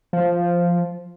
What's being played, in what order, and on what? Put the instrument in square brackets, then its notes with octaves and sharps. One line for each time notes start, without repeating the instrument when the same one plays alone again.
[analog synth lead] F3